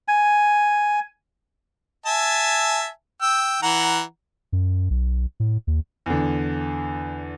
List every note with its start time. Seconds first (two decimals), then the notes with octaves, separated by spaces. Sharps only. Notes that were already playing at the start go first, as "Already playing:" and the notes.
0.08 G#5
2.06 E5 G#5 A5
3.22 G5 E6
3.62 E3 F#5 A#5
4.52 F#2
4.90 B1
5.40 A2
5.67 D#2
6.06 E2 D3